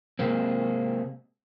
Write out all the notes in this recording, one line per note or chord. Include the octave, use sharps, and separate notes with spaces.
C3 G#3 A#3 C4